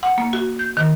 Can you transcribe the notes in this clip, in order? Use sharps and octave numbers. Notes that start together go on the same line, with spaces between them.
F#5
A#3
F#4
G6
D#3